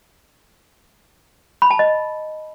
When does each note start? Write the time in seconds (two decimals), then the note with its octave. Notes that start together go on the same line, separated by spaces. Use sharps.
1.62 B5
1.71 A5
1.79 D#5